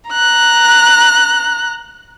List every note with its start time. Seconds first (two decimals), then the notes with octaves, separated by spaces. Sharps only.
0.10 A#5 F#6